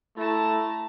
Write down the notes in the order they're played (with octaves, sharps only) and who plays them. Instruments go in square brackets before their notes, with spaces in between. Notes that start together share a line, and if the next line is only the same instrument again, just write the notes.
[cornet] A3 [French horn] E4 [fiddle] A5 A#5